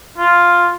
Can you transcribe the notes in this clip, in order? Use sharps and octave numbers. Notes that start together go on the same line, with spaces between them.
F4